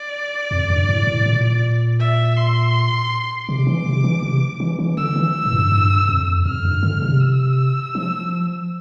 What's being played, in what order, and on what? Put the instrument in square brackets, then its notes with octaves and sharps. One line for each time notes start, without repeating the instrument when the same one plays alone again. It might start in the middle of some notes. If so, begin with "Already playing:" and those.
Already playing: [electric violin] D5
[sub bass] F2
G2
A2
A2
A#2
[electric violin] E5
C6
[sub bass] C3 [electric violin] D6
[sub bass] E3
C3
E3
C3
E3
E3
[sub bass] D3 [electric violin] E6
[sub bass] E3
A2
G2
G2
F2
[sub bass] F2 [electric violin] F6
[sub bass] G2
D3
C3
[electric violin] E6
[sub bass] F3